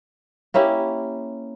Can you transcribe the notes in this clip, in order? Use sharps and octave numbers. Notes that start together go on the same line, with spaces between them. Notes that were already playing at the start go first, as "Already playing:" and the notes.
A#3 C#4 E4 G4